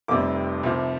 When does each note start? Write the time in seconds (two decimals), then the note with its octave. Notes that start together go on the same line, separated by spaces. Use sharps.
0.08 F1 F2 C3 G3 D6
0.63 C2 C3 F3